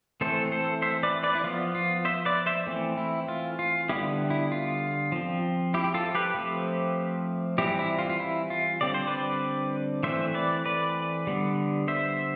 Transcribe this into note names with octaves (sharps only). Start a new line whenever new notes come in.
E3 A3 C4 A4 C5
A4 C5
C5 E5
B4 D5
B4 D5
E4
F3 B3 F4
F4
C5 E5
B4 D5
C5 E5
E3 A3 C4
E4
F4
F4
D3 G3 B3 E4 G4
E4
F4
F3 C4
E4 G4
G4
F4 A4
G4 B4
F3 A3 C4
E3 G3 C4 E4 G4
E4
F4
F4
E4
F4
D3 G3 C4 D5
C5
B4 D5
E3 A3 C4 C5 E5
B4 D5
B4 D5
D3 G3 B3
C5 E5